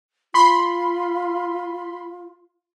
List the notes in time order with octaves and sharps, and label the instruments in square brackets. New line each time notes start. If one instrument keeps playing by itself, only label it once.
[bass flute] F4 [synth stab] B5 C6